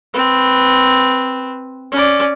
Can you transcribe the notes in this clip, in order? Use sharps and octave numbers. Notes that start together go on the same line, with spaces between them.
C4 B4
C#4 D5